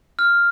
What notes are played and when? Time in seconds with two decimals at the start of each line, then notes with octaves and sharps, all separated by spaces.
0.19 F6